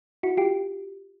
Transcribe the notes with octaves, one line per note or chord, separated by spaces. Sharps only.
E4 F#4
F4 G4